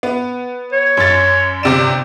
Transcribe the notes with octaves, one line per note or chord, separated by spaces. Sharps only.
B3
C#5
F#2 A6
G1 C3 D5 E7